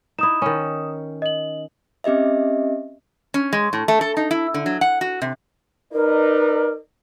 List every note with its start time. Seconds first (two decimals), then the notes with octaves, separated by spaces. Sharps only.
0.19 D#4 E4 D#6 E7
0.42 D#3 C#4
1.22 D#5 F#7
2.04 C4 C#4 G4 D#5 E5
3.34 C#4
3.53 G#3
3.73 A2
3.88 A3
4.01 A4
4.17 D#4
4.31 E4
4.54 D3
4.66 F#3
4.81 F#5
5.01 F#4
5.22 C3
5.93 D#4 A#4 B4 D5